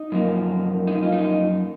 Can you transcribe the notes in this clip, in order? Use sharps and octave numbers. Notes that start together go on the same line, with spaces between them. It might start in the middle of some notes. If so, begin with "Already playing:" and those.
Already playing: D#4
F#2 F3 A#3
D#4
F4
D#4